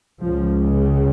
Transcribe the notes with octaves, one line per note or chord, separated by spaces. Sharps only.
C#2 C#3 F3